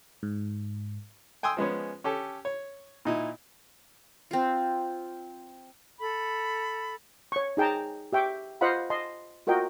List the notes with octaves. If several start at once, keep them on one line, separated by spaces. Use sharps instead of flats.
G#2
G5 G#5 C6 D#6 E6
F3 G#3 B3 C#4
C#4 G4 A4
C#5
A#2 D#4 E4
C4 F4
A4 B5
C#5 C#6
D#4 G#4 G5 A5 A#5
G4 E5 G5 C#6 D6
F4 C5 D#5 F5 F#5 B5
D#5 A5 C6
F4 F#4 A#4 D#5 G5